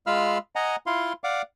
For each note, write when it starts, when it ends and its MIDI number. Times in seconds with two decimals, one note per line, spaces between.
0.07 0.38 56
0.07 0.38 65
0.07 0.38 77
0.07 0.38 83
0.07 0.38 88
0.07 0.38 89
0.56 0.76 75
0.56 0.76 78
0.56 0.76 80
0.56 0.76 82
0.86 1.13 64
0.86 1.13 65
0.86 1.13 77
0.86 1.13 84
1.24 1.42 74
1.24 1.42 77
1.24 1.42 78
1.24 1.42 86